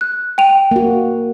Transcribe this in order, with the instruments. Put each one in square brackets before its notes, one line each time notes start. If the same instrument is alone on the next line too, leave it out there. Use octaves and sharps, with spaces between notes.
[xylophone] F#6
G5 D#7 F7
[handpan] A#3 F#4